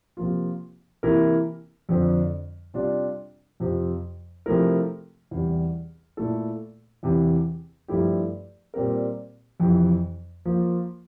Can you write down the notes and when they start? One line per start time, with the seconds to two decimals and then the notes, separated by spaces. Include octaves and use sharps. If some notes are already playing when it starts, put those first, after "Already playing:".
0.17 C3 F3 A#3 F4
1.03 C3 E3 A#3 E4 A#4
1.89 F2 D3 F3 C4
2.74 C3 G3 D4 F4
3.60 F2 C3 F3 C4
4.46 C3 F3 A3 E4 A#4
5.31 E2 C3 G3
6.17 A#2 A3 E4 A4
7.03 E2 C3 E3
7.88 G2 F3 A3 E4 G4
8.74 A#2 G3 C4 G4 A#4
9.60 F2 C3 E3
10.45 F3 A#3 F4